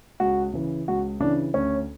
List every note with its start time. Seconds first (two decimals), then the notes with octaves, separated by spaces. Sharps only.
0.20 C#2 F#4
0.54 C#3 E3
0.88 C#2 F#4
1.20 C#3 E3 D4
1.54 D2 C#4